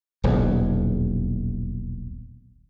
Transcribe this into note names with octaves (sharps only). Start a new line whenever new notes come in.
D#1 B1 E2